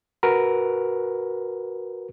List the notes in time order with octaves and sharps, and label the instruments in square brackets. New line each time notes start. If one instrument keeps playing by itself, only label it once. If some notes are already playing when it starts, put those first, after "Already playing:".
[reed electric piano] F#4 A#4 B4